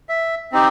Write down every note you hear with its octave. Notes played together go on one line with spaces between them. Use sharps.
E5
C4 D#4 G4